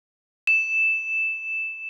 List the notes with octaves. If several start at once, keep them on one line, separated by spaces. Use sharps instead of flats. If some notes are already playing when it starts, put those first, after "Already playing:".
E7